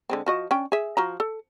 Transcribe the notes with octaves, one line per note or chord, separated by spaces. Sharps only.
D3 G#3 C4
F3 F#4 D#5
C#4 D4 G5
G#4 E5
F3 F#4 A#5
A4